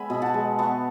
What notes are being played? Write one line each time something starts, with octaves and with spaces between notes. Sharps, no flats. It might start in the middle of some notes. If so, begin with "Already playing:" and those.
Already playing: G#3 B3 E5 G#5 B5
B2
F#5 A5
G#3
B3 A5 C#6